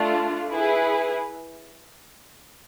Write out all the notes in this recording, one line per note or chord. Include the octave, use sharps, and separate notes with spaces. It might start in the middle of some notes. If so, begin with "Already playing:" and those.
Already playing: A3 D4 F4
E4 G#4 B4